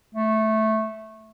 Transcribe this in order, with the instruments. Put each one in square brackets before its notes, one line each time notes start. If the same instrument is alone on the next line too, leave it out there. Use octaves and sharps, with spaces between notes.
[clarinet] A3